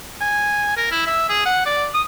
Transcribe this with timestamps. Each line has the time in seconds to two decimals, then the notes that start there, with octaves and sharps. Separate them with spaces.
0.21 G#5
0.76 A#4
0.91 E4
1.06 E5
1.29 G#4
1.45 F#5
1.65 D5
1.94 D#6